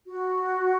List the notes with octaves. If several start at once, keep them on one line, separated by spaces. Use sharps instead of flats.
F#4